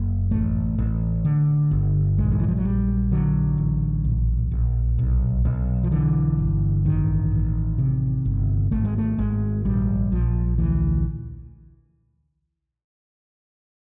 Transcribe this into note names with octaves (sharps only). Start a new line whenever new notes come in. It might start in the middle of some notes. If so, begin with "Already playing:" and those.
Already playing: F#1 A#3
A1 A3
A1
D3
G1
A#1 G#3
D#3
E3
F3
F#3
A#1 G3
D3 F#3
A1
A#1
A#1
B1
B1
F3
D3 E3
G1
A1 D#3
A1
C3
G1
G#1 A3
G#3
A3
G#1 G#3
A#1 G3
A#1 F3
D2 E3